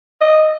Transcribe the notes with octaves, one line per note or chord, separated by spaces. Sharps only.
D#5